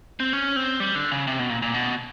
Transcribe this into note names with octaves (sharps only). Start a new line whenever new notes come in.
C4
C#4
C4
G3
D3
C#3
C3
B2
A#2
A#2
B2